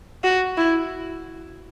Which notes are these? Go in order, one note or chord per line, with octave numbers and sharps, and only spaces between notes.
F#4
E4